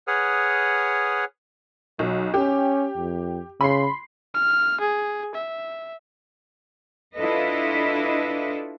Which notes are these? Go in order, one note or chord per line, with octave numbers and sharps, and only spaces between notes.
G#4 B4 C#5 F#5 D#6 F6
B1 F#3
C#4 G4
F2
C#3 B5 C6 C7
F6
G#4
E5
D4 E4 F4 A4 B4 D#5